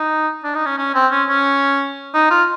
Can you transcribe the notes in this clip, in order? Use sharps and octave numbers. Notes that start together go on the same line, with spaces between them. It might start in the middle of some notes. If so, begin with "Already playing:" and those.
Already playing: D#4
D4
D#4
C#4
C#4
C4
C#4
C#4
D#4
F4